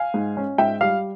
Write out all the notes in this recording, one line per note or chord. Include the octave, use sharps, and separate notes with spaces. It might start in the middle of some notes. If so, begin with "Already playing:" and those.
Already playing: F5 G#5
G#2
C#4
G#2 E5 G5
G3 F5